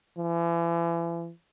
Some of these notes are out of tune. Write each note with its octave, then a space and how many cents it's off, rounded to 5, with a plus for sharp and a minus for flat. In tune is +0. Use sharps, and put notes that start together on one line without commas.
E3 +40